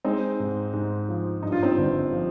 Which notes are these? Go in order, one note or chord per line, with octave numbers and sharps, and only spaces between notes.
G#3 C4 D#4
G#2
G#2
F3
G2 D#4
F4
C4 D#4
G1
F3